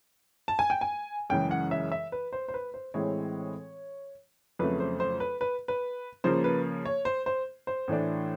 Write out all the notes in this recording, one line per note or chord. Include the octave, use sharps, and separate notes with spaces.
A5
G#5
G5
G#5
F#2 C#3 E3 G#3 G5
F#5
E5
E5
B4
C5
C5
B4
C5
A2 E3 G#3 C4 E4 C#5
F2 C#3 F#3 A3 B4
C5
C5
B4
B4
B4
C#3 F3 A#3 C5
B4
C#5
C5
C5
C5
A2 E3 A3 D4